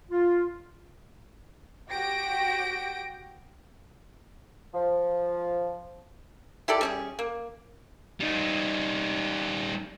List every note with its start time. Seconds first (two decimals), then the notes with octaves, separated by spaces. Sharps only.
0.11 F4
1.90 F#4 G4 G5 A#6 D7
4.74 F3
6.68 E4 G4 A4 D5
6.81 G3 C#4 G#4
7.19 A#3
8.20 G3 D#4